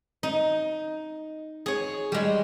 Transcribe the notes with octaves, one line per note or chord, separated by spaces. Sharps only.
D#4
G#4 C#5
G3 G#3